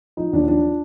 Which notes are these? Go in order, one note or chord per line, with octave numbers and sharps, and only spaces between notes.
F3 D#4
D#2 D4
F3 D4